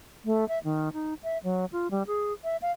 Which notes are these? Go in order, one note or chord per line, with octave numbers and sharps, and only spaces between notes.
A3
E5
D#3
D#4
E5
F#3
F4
G3
G#4
E5
F5